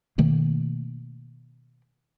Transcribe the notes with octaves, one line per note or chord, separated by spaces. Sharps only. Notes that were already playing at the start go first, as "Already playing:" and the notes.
B2 D#3 A3 A#3